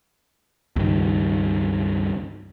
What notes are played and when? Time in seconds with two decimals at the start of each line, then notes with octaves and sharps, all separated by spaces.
0.76 C#2 G2 D#3